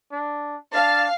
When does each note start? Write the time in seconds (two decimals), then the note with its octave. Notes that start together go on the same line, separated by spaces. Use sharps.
0.12 D4
0.73 D4 F5 A5